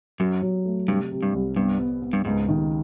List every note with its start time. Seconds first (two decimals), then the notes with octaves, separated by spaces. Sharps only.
0.19 F#2 F#3
0.42 F#3
0.65 A3
0.88 G2 C3
1.12 C3
1.23 G2
1.34 C2
1.56 G2 B3
1.80 B3
2.02 B3
2.13 G2
2.25 C#2 G#2
2.49 D#3